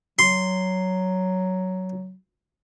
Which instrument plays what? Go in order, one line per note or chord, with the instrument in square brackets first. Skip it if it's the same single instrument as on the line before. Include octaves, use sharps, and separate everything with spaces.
[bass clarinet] F#3 [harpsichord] C6